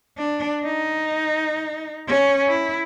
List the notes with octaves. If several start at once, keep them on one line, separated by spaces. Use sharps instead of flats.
D4
D#4
C#4
E4